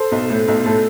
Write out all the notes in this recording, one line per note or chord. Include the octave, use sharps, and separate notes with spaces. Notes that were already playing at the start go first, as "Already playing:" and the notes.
Already playing: A4 C5
B1
A2
B1
A2 A4